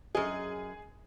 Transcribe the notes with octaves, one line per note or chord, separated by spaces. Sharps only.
F#2 G#4 D#5